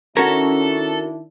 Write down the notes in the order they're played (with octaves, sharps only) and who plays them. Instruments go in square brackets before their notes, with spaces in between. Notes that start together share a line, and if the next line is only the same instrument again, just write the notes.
[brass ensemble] D#3 D4 E4 [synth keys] C#4 [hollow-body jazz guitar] F#4 A#4 [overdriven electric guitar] A4